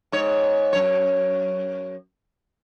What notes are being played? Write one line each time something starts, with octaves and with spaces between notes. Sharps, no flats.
G#2 C#5
F#2 C#5